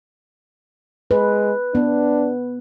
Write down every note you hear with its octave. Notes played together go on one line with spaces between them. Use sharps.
G#3 B4
B3 D4